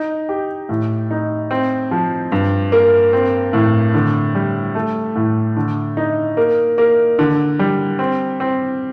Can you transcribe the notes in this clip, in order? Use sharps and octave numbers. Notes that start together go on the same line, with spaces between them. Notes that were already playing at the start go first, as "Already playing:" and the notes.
Already playing: D#4
G4
A2
D#4
C4
F3
G2
A#3
C4
A2
D3
G3
A3
A2
D3
D#4
A#3
A#3
D3
G3
C4
C4